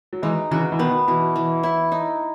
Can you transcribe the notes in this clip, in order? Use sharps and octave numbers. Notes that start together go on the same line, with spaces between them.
F#3
E3 G#3 D#4
C#3 E3 F#4
E3
B2 D#3 B3
B2 E3
E3
E4
D#4